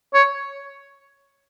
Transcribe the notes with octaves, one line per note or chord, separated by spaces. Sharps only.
C#5